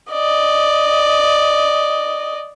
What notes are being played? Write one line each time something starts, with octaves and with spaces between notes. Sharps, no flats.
D5 D#5